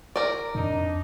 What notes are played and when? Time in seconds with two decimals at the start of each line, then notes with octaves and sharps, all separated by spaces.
0.16 A#4 D5
0.55 F2 D4 D#4